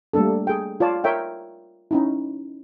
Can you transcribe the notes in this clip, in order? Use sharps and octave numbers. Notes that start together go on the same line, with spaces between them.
G3 A3 A#3 D4 A4
G#4 G5
F4 C#5 D5 A5
A#4 C#5 E5 G5
C#4 D#4 E4